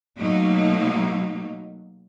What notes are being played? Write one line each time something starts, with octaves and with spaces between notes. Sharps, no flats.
B2 F#3 A3 A#3 D#4